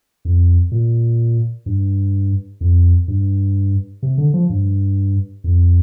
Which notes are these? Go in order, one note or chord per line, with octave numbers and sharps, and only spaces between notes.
F2
A#2
G2
F2
G2
C3
D3
F3
G2
F2